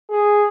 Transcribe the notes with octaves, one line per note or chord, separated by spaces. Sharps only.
G#4